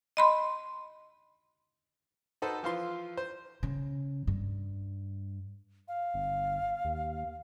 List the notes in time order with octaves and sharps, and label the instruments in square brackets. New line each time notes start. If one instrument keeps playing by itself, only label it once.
[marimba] D#5 B5 C6
[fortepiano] D#4 F#4 A4 B4 C5
E3 F3 F4 C6
C5
[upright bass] C#3
G2
[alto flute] F5
[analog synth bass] G1
D#2